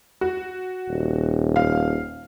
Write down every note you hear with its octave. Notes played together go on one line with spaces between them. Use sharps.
F#4
D#1
F5